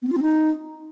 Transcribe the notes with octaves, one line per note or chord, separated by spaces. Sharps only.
B3
C4
F4
C4
D#4